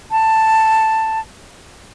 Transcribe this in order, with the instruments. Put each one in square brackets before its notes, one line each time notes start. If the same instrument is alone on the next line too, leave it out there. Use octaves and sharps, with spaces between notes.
[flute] A5